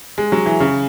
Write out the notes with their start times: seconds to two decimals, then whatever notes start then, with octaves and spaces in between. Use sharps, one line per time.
0.18 G#3
0.32 F#3
0.46 E3
0.60 C#3